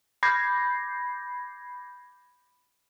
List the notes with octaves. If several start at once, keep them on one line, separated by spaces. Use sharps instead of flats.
B5 D6 G6 G#6 A#6 C7